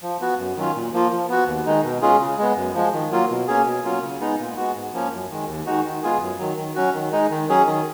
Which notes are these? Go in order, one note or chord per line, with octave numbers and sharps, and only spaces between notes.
F3
B3 F#4
F#2
D#3 F#3 C#4 F4
A#2
F3 A#3 F4
F3
B3 F#4
D#2
D#3 G#3 D#4
B2
G#3 C#4 F4 G#4
C#3
G#3 B3
F#2
F3 G#3
D#3
F#3 A#3 F4
B2
A#3 C#4 G#4
B2
F#3 A#3 C#4 F4
C#3
G#3 B3 D#4
A#2
G#3 B3 F#4
G#2
F3 A#3 C#4
F#2
D#3 G#3
D#2
D#3 G#3 D#4 F#4
D#3
G#3 B3 F4 G#4
F#2
D#3 F#3
D#3
F#3 C#4 F#4
D#3
G#3 D#4
D#3
F#3 C#4 G#4
D#3